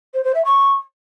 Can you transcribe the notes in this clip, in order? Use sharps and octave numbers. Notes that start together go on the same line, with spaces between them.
C5
C5
E5
C#6